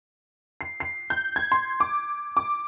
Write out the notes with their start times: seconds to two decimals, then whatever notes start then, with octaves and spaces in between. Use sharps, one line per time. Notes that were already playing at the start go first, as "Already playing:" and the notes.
0.61 C7
0.80 C7
1.10 G6
1.36 G#6
1.52 C6
1.80 D6
2.37 D6